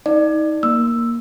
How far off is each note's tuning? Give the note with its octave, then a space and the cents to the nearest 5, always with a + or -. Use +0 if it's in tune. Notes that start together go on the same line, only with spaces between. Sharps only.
D#4 +30 D5 +25
A#3 +5 E6 +0